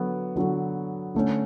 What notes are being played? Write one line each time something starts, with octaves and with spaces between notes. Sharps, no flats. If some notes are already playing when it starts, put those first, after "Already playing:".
Already playing: D3 F#3 B3 F#4 A4
D3 F#3 B3 F#4 A4
D3 A3 C#4